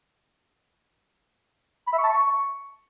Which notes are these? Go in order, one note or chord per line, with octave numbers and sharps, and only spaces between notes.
B5
E5
C#6
A5
C#6